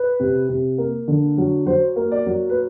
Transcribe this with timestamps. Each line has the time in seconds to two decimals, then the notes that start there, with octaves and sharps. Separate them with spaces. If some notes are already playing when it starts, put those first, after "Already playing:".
Already playing: B4
0.20 C3
0.49 C3
0.78 A#3
1.08 D3
1.38 F#3
1.66 F#3 C5
1.96 A#3
2.12 D5
2.26 F#3
2.50 B4